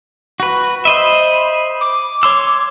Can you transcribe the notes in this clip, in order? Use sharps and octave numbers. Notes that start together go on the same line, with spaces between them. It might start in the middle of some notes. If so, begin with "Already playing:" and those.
F#4 B4
C5 D#5 E5 B5
D6
C#5 C6 E6